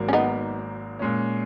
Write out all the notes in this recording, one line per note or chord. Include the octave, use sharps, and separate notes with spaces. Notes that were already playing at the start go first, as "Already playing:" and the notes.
Already playing: G#1 G#2 F#3 A#3
C#4
B3 D#4
A#2 G#3 C#4